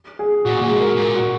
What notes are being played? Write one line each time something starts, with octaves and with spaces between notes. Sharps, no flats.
G#4
A#2 F#4
A#2 G#4
G#2
A#4
A#2 A#4
F#4